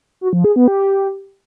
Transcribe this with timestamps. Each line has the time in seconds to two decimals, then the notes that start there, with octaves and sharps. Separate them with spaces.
0.21 F#4
0.33 F3
0.44 G#4
0.56 B3
0.68 G4